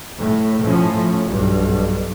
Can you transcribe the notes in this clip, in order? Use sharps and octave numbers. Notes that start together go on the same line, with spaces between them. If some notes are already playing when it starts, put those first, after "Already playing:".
A2
A2 F3 C#4
B1 G2